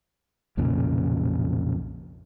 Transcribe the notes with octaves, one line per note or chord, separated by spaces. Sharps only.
B1 F2 A#2 C#3